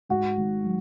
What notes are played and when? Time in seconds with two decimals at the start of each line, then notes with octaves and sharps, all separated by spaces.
0.09 G#2 F#4
0.37 G#1
0.64 F#3